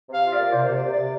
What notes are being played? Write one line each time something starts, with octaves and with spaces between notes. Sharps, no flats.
C3 F5
F4
D5
A#3
C3 C5
C3 C5
D5
C3
D5
C3